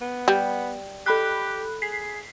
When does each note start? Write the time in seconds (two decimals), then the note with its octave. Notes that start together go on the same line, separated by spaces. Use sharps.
0.02 B3
0.28 G3
1.06 G4 A4 B5 F#6
1.82 G#4 B6 C7